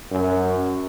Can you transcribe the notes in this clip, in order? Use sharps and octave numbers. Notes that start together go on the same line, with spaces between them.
F#2